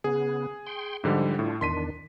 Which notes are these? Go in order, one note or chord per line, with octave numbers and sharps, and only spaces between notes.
C#3 B3 G#4
G5 C6
G#2 D3 F3 G3
A2 D4 F4
E2 D#3 D4 C6 B6 D#7